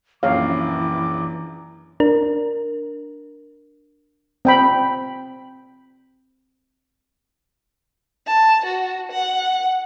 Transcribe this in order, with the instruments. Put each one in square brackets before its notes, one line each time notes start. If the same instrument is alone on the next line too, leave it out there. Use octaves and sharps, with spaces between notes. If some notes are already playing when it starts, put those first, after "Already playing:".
[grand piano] A#1 F#2 [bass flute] E3 [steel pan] C#5 F5 [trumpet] D6
[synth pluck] D4 A#4
[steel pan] C4 G5 B5
[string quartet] A5
F#4
F#5